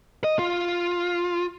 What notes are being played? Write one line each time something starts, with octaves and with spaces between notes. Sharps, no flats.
D#5
F4